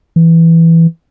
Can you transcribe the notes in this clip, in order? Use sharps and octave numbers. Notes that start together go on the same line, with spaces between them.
E3